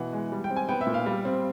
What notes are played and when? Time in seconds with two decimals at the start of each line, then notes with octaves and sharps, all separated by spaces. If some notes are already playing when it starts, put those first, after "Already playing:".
Already playing: B2 E3 F#5
0.13 G#3
0.32 G3
0.44 G5
0.50 C4
0.56 G#5
0.69 B3 G5
0.81 E5
0.87 A#2
0.94 F5
1.06 G3
1.25 C4